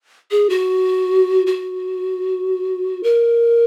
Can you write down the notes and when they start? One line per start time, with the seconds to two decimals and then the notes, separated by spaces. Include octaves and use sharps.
0.31 G#4
0.50 F#4
1.47 F#4
3.03 A#4